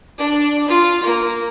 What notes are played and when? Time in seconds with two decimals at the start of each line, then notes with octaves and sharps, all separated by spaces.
0.18 D4
0.68 F4
1.03 A#3